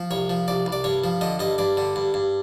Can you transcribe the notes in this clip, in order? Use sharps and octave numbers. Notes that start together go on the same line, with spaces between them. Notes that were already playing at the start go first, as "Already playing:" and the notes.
Already playing: F3
C2 C#5
F3
C2 D5
C2
D5
G2 C#5
F3
D3 D#5
G2 D#5
G2 D5
D3
G2
G2